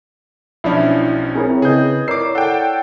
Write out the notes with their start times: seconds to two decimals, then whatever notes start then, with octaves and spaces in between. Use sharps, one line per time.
0.64 B1 F3 C#4 D4 E4
1.35 C4 E4 G#4 A#4 C#5
1.62 C#3 G#4 B4 D#5 G6
2.08 E4 A#4 C#5 D5 D6 E6 C7
2.35 A4 F#5 G5